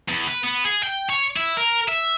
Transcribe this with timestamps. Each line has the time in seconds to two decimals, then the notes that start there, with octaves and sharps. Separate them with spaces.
0.09 E2
0.28 B4
0.44 B3
0.65 G#4
0.83 G5
1.10 C#5
1.36 E4
1.57 A#4
1.89 E5